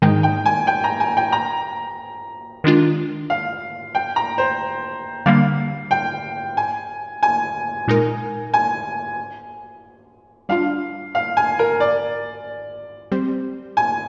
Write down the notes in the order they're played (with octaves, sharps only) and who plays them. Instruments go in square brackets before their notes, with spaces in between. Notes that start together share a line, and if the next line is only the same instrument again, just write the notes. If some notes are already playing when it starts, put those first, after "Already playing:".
[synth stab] G#2 D#3 G#3 D#4 [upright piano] G5
[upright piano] G5
G#5
G5
A#5
G#5
G5
A#5
[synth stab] D#3 G#3 D4 F4
[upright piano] F5
G5
A#5
C5
[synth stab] D3 G3 A#3 [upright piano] F5
[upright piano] G5
G#5
G#5
[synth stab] A#2 G#3 D#4 A#4
[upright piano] G#5
[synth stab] G3 D4 F4 [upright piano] F5
[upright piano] F5
G#5
A#4
D5
[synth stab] G3 C4 G4 C5
[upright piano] G#5